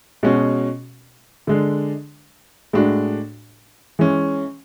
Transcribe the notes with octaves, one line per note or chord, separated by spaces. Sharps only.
B2 G#3 C#4 F#4
D3 G#3 D4
A2 G#3 D4 F#4
E3 G#3 C#4